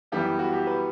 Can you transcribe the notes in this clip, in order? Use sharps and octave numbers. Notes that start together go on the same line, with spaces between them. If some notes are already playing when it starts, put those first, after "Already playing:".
F#2 E3 G3 B3 G4
F#4
G4
B4